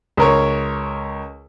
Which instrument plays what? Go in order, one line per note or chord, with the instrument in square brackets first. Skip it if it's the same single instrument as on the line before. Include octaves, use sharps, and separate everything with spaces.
[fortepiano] C#2 A#4 C#5